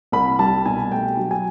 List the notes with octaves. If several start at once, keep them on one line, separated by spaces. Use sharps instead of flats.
C2 B5
G3 A5
B2 G#5
A3 G5
F#3
G#5